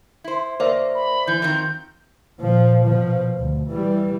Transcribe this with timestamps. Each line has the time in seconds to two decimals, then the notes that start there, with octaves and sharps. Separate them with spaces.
0.24 E4 C5
0.60 A#3 C5 D5 E5
0.95 B5
1.27 E3 G6
1.42 D#3 F3 C4
2.40 A#2 F3
2.85 B2 F3
3.37 D2
3.69 E3 G3